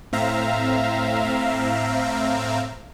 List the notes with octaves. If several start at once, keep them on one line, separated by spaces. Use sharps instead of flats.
A2 C4 E5 F5 A#5